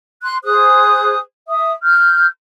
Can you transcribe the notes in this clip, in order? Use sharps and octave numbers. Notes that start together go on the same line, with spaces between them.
C6 F#6
G#4 C5 D#6 F#6
E5 D#6
F6 G6